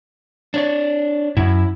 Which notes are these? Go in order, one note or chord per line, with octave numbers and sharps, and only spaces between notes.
D4 C#5 D5
F#2 E4